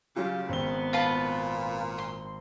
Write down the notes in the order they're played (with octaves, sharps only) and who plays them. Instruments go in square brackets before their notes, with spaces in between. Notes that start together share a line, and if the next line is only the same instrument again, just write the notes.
[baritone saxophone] C#3 [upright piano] F#3 F4 [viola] G4
[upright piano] G#1 C4 G7 [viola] B3
[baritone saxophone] A#2 [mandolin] F4 B4 A5
[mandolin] C6